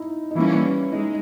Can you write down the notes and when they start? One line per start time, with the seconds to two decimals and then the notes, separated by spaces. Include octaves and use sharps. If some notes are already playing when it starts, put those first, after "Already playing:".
Already playing: D#4 E4
0.31 D#4
0.36 E3 G3 A#3 C#4 E4
0.91 G#3 D#4